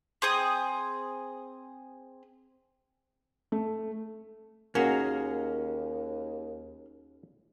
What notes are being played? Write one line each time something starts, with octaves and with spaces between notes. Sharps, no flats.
C4 G#4 D#6
A3
D#2 A#3 C#4 F#4 G#4